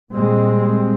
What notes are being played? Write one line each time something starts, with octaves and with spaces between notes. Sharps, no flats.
A#2 G3 G#3 C4